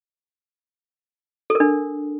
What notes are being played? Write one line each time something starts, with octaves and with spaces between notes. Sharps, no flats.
A4
A#4
D4